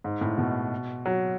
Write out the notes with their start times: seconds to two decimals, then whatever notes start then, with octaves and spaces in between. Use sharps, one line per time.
0.04 G#2
0.21 A2
0.38 B2
1.06 F#3